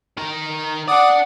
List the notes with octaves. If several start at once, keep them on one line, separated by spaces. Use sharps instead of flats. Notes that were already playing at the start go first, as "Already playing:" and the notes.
D#3 A#4
D4 D5 F#5 D6 D#6